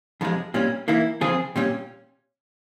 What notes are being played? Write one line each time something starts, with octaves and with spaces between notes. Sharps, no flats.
F2 C3 F3 G#3
A#2 G3 C#4
E3 A#3 E4
C#3 F3 C4 F4 G#4
A#2 G3 C#4